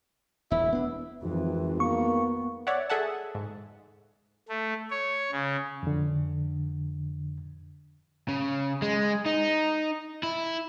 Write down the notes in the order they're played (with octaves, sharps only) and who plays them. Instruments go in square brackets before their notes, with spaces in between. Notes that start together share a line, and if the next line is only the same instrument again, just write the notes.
[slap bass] E1 E2 [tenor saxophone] E4
[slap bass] B3 D4
[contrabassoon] G#1 [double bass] F2 E3
[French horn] A#3 [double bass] B3 [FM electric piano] C#6
[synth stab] C#5 D5 E5 F#5
G#4 A4 E5 F#5 A5
G#2
[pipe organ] A3
C#5
C#3
[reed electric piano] F2 D3
[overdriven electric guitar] C#3
G#3
D#4
E4